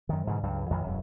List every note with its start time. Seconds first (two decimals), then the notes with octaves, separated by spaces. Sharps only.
0.09 F#2 D#3
0.27 G#2 B2 D3 E3
0.43 C#2 G2 F#3 G3
0.70 A1 F2 D#3
0.86 E1 F#2